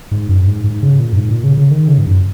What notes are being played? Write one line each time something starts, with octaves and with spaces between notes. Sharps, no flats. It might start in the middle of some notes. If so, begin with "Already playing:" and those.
G#2
F#2
G#2
G#2
C#3
A#2
F#2
G#2
A#2
C#3
C#3
D#3
C#3
G#2
F#2